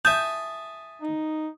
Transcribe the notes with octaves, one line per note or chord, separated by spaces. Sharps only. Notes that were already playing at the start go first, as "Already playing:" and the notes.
E5 G#5 A5 D#6 G6
D#4